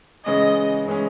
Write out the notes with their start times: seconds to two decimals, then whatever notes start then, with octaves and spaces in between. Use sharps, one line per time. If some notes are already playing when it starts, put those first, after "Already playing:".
0.25 C#3 E3 G#3 C#4 D#5
0.86 C#3 E3 G#3 C#4